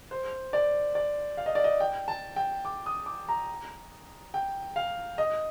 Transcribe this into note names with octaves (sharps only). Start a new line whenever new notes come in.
C5
D5
D5
F5
D#5
D5
D#5
G5
A5
G5
D6
D#6
D6
A#5
G5
F5
D#5